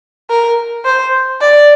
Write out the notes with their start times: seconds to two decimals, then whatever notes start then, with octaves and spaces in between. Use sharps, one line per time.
0.30 A#4
0.85 C5
1.41 D5